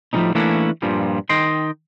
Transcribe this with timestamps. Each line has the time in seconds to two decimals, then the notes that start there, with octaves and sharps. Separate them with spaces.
0.13 A2 F3 G3 G#3 C#4 D#4
0.35 E3 A3 A#3 C#4 D4 E4
0.82 G2 A#2 F3 G3
1.29 D#3 D#5 G5 C6